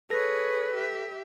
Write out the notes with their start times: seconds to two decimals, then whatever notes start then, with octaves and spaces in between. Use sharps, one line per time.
0.10 G#4 A4 B4 C#5 A#6
0.74 G4 E5